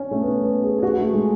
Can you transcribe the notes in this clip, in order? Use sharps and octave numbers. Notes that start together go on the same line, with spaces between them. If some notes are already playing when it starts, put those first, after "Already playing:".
Already playing: C#4
A3
B3
B3
G#4
G#4
F#4
A3
G#3